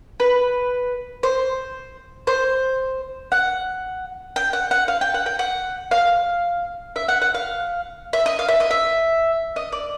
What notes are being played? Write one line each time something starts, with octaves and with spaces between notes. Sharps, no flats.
B4
C5
C5
F#5
G5
F#5
F#5
F5
G5
F#5
G5
F#5
F5
E5
F#5
F#5
F5
E5
D#5
F5
E5
D#5
E5
D#5
D5